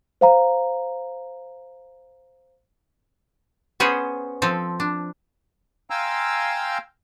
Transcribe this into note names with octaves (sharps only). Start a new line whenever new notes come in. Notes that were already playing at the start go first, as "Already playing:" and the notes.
C5 F5 A#5
B3 C#4 G#4 C5
F3 C4 A4
D4
F5 G5 G#5 A#5 C6 E6